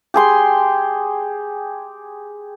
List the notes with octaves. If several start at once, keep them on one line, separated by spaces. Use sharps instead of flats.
G4 G#4 C6